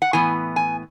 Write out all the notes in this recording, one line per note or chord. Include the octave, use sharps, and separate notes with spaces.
F#5
A2 E3 B3 G#5
G#5